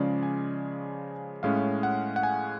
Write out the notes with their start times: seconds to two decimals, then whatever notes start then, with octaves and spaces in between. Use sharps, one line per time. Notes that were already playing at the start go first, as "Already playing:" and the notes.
Already playing: C#3 F3 G#3 C#4 D5
0.23 G#5
1.43 A2 G#3 C#4 F5
1.83 F#5
2.16 F#5
2.23 G#5